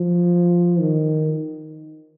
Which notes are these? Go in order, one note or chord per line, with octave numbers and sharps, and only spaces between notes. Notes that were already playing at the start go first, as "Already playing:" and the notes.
Already playing: F3
D#3